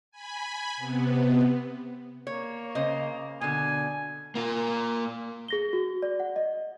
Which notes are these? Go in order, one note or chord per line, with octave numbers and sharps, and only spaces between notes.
G#5 B5
C3 B3
A#3 C#5
C#3 C5 D#5
B2 D3 G#5
A#3 F4
G#4 A#6 G7
F#4
D5
F#5
D#5